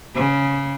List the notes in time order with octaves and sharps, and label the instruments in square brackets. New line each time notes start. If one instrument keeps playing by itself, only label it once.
[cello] C#3